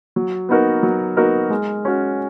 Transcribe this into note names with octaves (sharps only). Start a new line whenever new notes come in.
F#3
B3 D#4 F#4 A#4
F#3
B3 D#4 F#4 A#4
G#3
C#4 F#4